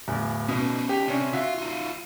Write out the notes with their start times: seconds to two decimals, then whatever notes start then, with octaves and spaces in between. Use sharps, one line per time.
0.07 D1 E2
0.49 B2 C#4 D#4
0.89 G4
1.08 C3 C#4 D4
1.33 F4 F#4 E5 F5
1.58 D#4 F4